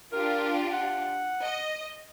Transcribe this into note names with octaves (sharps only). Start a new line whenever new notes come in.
D4 F4 G4 A#4
F#5
D#5